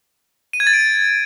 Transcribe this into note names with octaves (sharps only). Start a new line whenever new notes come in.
D#7
G#6
A6
D7